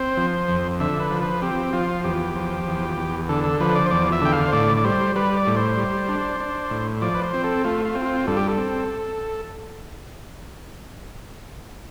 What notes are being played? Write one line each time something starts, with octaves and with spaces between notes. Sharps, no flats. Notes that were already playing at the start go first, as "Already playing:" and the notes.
Already playing: C4 C5
F3
F2
D3 E5
B4
F3
B4
C4 G4
F3 F4
E2 G4
F3
E2
E2
D3 A4
A4
F3 B4
D5
C5
E2 D5
E5
D3 G5
F5
C5
A2 D5
D5
G3 C5
G3 B4
D5
A2
C5
G3
D4
D4
A2
F3 D5
B4
C5
C4
A4
A3 F4
F4
C4
F4
G2 A4
G4
A4
C4